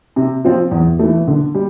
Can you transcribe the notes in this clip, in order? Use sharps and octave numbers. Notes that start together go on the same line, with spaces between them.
C3
F3 C4 F4
E2
E3 A3
D3
G3